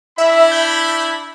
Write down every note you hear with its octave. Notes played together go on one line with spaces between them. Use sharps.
D4 E4 E5 B5
G6